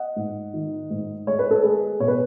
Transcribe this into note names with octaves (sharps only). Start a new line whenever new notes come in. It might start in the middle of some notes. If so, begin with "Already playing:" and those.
Already playing: D#5 F#5
G#2
D#3
G#2
G#3 C#5
B4
A4
G#3 G#4 B4
B2 C#5
B4